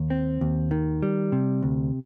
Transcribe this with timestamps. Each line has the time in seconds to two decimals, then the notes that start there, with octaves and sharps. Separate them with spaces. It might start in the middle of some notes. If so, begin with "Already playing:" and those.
Already playing: D#2
0.10 C4
0.41 D#2
0.71 D#3
1.03 G3
1.32 C3
1.63 D2